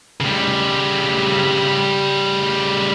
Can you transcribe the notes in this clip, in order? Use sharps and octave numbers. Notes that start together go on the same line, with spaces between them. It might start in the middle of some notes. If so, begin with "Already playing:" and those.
C#3 G3